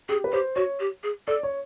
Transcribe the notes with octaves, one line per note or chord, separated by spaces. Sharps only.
G4 G#4
B4
G4 C5
F#4 C#5
G4
G#4
A4 D5
C#5